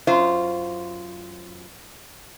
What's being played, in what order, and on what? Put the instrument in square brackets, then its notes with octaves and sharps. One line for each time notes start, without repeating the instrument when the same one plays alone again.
[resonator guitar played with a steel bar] F#2 F4 C5